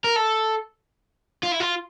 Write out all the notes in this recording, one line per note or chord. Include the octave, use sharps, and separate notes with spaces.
A#4
A4
F4
E4
F4